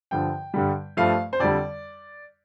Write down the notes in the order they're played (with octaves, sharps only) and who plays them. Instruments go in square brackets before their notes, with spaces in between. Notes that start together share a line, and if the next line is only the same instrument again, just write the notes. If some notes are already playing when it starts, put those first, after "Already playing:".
[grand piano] G2 D3 F3 G5
G2 D3 G3
G2 F3 A3 F5
C5
F2 D3 G3 D5